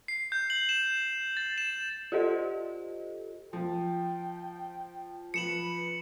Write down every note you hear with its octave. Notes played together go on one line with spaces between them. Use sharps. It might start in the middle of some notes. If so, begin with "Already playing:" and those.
C7
G6
F#7
E7
A6
E7
F4 G4 A4 C5 D#5
F3 G5
F3 B4 C#7 E7 F#7